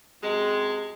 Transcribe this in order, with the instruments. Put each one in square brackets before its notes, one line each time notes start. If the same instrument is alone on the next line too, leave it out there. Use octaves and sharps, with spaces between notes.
[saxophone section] F#2 C3 G#3